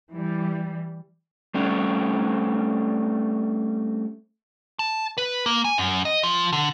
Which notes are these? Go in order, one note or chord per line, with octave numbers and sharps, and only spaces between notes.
E3 G3
G3 A3 C4 C#4
A5
B4
A#3
G#5
F#2
D#5
F3
D3